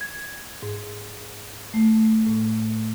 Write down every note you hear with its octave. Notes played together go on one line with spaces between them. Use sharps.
G#6
G#2
A3
A2